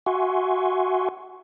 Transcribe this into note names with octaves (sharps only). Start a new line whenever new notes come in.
F#4 E5 F#5 G#5 C6 C#6